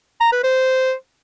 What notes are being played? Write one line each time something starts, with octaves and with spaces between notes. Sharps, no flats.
A#5
B4
C5